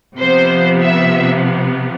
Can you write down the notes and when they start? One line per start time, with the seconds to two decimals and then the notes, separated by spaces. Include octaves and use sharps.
0.17 C3 F3 B3 C5
0.81 E5